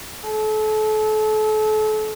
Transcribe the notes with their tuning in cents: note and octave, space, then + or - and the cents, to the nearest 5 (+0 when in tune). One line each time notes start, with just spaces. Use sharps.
A4 -35